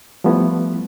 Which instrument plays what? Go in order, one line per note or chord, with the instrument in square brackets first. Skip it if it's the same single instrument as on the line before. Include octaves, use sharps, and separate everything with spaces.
[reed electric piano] F3 G3 A3 B3 E4